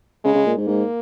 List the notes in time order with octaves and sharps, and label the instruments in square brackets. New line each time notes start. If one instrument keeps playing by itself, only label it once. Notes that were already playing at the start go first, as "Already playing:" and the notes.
[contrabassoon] C#3 [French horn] G#3
[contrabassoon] C#3
A#2
G#2
[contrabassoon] G#2 [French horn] A#3